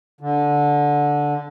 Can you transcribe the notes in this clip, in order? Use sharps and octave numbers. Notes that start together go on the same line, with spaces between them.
D3